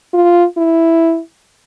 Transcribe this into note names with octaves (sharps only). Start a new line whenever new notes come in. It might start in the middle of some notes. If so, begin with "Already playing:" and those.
F4
E4